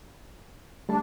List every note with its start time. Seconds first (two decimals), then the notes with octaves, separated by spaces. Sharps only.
0.89 G3 A3 D4 A5